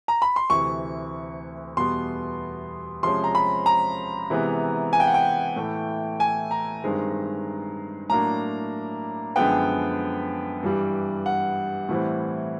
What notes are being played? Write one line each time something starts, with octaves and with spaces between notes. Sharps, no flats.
A#5
B5
C6
D2 C3 E3 C#6
E2 B2 G3 B3 C6
C3 F3 G#3 C#4 C6
A#5
B5
A#5
C3 E3 G#3 B3
G#5
G5
F#5
G5
A2 E3 A3
G#5
A#5
G2 D#3 G#3 C4
A2 F#3 A#3 D4 A#5
F#2 D3 F3 G#3 B3 G5
G2 E3 G3
F#5
A2 E3 G3 C4